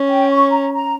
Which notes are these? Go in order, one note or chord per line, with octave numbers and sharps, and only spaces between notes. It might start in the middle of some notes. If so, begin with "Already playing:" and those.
Already playing: C#4
G5
C#6
A#5
A#5